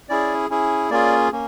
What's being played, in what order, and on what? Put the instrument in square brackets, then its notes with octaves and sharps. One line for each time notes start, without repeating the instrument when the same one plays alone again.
[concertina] C#4 E4 G#4 D5
C#4 E4 G#4
A#3 C#4 F4 G#4 D5
A#3 C#4